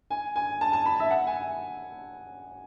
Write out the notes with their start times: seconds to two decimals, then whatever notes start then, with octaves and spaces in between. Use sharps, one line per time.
0.10 G#5
0.36 G#5
0.61 A5
0.73 A5
0.86 B5
1.00 E5
1.11 F#5
1.27 G#5